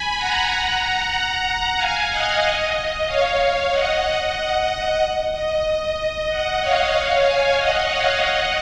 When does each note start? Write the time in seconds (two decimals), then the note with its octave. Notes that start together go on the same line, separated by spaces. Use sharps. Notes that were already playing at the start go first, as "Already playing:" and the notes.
Already playing: G#5 B5
0.17 F#5 A#5
0.49 F#5 A#5
1.77 F5 G#5
2.11 D#5 F#5
2.42 D#5
3.07 C#5 F5
3.71 D#5 F#5
5.32 D#5
5.64 D#5
6.29 D#5 F#5
6.61 C#5 F5
7.25 F5 G#5
7.58 D#5 F#5
7.90 C#5 F5
8.22 D#5 F#5